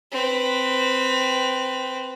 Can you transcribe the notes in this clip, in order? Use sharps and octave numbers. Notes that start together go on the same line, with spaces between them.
C4 B4